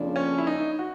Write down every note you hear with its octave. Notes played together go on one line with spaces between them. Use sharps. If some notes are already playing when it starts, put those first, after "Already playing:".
Already playing: F2 C#3 F3 A#3 D4
C#4
E4
D#4
F#4